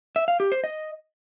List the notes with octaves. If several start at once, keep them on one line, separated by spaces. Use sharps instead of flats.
E5
F5
G4
C5
D#5